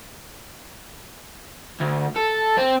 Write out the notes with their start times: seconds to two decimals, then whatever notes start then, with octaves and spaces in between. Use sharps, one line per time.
1.80 D2
2.16 A4
2.58 C4